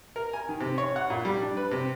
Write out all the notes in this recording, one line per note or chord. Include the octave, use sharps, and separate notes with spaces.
A#4
G#5
D#3
C3
C#5
F#5
A#2
G3
D4
B4
C3